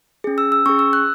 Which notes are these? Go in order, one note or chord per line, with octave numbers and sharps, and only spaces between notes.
C#4 G#4
E6
E6
C#4 G#4 C#6
E6
F#6